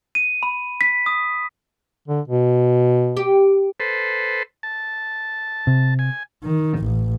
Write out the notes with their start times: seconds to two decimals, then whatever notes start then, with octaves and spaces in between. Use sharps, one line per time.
0.15 D#7
0.43 B5
0.81 B6
1.06 D#6
2.08 D3
2.28 B2
3.17 G4
3.80 A4 B4 C5
4.63 A5
5.67 C3
5.99 G#5
6.44 D#3
6.79 A1